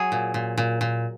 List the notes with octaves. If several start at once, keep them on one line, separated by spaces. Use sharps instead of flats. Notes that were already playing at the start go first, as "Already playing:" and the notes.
Already playing: F#3 G#4
A#2
A#2
A#2
A#2